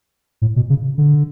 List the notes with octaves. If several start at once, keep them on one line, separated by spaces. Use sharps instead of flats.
A2
B2
C#3
D3